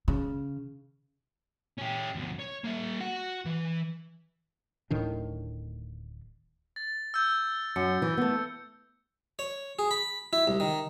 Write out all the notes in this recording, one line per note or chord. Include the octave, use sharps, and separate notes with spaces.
C#3
C#4 G4
D2 B2
C#5
A#3 E5
F#4 F#5
E3
D1 A2 D#3 D4
A6
E6 G6
F#2 C#7
E3
A3 B3
C#5
G#4
B5
E4
C2
D#3